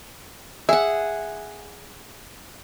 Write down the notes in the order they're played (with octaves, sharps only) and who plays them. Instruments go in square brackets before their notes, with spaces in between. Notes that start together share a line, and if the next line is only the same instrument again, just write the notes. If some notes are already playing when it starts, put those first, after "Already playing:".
[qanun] G#4 F#5 [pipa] E5